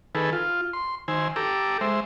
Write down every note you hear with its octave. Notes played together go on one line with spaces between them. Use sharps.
D#3 G#4 A4 B4 E6
F4
C6
D#3 C5 G#5 E6
G4 A4 A#5 D6 E6
G#3 C5 E5